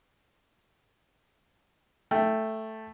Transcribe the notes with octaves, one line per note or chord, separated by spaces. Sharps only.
A3 G5